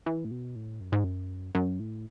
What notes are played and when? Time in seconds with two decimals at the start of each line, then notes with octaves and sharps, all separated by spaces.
0.06 E3
0.25 A2
0.31 B2
0.56 A2
0.80 F#2
0.92 G#2
1.04 F#2
1.55 F#2
1.80 A2